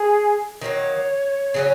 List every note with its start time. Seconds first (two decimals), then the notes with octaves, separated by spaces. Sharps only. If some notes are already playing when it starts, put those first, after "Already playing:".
Already playing: G#4
0.61 D#3 F#3 A#3 C#5
1.54 C#3 F#3 C#4